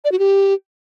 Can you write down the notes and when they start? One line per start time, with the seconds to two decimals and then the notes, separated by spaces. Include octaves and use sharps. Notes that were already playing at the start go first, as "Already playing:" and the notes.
0.04 D5
0.12 F#4
0.19 G4